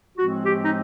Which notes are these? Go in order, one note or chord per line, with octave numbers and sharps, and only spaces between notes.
A2 F3 G#3 C4 F#4
G4
D#4